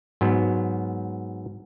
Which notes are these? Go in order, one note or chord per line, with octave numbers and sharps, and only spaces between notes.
G#2 F#3 B3